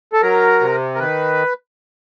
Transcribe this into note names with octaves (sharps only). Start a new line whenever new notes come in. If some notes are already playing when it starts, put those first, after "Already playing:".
A4
F#3 A#4
C3
A#4
D#3 B4